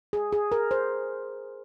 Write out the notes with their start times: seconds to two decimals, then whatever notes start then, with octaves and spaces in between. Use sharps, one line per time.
0.13 G#4
0.32 G#4
0.52 A#4
0.71 C5